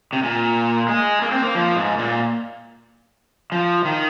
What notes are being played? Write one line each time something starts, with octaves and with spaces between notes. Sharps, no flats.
C3
A#2
G#3
A#3
C4
A#3
F3
G#2
A#2
F3
D#3